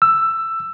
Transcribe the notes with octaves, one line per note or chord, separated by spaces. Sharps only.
E6